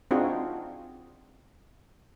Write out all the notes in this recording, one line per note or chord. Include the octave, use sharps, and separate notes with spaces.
C4 D4 D#4 F4 F#4 G#4